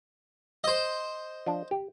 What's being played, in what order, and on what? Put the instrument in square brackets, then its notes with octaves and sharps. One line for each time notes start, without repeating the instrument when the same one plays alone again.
[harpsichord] C5 D#5
[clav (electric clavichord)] F3 D4
G4